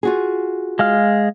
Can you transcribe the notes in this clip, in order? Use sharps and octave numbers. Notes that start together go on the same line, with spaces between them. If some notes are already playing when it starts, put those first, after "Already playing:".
F4 F#4 G#4
G#3 F5 F6